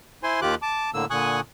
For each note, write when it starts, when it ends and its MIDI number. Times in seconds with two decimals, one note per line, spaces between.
0.23 0.40 64
0.23 0.40 72
0.23 0.40 80
0.23 0.40 84
0.42 0.55 39
0.42 0.55 51
0.42 0.55 65
0.42 0.55 67
0.42 0.55 86
0.42 0.55 90
0.62 0.90 81
0.62 0.90 86
0.94 1.05 45
0.94 1.05 50
0.94 1.05 58
0.94 1.05 88
1.10 1.40 46
1.10 1.40 50
1.10 1.40 80
1.10 1.40 85
1.10 1.40 87
1.10 1.40 90